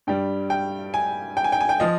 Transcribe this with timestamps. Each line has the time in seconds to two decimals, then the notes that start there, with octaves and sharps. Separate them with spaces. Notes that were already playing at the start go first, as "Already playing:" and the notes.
0.07 G2 G3 G5
0.50 G5
0.94 G#5
1.37 G5
1.44 G#5
1.52 G5
1.61 G#5
1.69 G5
1.80 F3 D#5